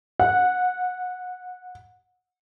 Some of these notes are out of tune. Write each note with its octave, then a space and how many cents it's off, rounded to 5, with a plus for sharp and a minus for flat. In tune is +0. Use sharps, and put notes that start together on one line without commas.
F#5 -20